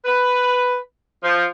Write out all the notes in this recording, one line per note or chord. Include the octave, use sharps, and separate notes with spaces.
B4
F3